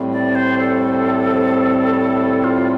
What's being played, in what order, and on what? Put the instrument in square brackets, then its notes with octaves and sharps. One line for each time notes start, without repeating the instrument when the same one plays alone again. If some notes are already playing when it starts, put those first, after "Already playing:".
Already playing: [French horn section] A2 G3 C4
[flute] D5
C5
A4
F4